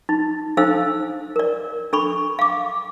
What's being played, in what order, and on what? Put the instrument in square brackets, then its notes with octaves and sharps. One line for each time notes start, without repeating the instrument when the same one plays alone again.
[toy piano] D#4
D4 D#4 A4 C5 F5 E6
A#4 D5
D4 A4 B5 C#6
F5 D6